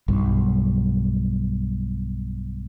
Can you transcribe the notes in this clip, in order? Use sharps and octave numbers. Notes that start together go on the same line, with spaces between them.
B1 G2